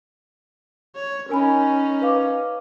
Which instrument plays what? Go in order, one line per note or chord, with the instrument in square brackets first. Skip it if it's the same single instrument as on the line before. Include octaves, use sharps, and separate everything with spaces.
[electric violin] C#5
[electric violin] C#4 D#4 [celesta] A#4 G#5 B5
[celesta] B4 F5 D6